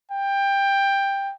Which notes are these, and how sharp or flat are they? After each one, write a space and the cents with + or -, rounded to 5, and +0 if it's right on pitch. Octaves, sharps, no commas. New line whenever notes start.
G5 +15